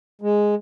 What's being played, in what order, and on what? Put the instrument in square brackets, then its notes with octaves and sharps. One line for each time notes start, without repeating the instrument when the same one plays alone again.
[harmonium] G#3